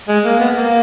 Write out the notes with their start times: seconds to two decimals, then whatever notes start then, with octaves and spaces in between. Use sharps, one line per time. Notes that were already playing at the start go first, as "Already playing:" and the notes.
0.08 G#3
0.25 A#3
0.40 B3
0.56 A#3